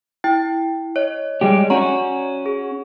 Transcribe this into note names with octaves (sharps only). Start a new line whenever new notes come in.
E4 G5
C#5 D#5
G3 G#3 G4
C#4 F#4 D5 A#5
G#4